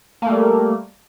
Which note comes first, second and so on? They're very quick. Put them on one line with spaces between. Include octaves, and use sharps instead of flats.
A#3 A3 G3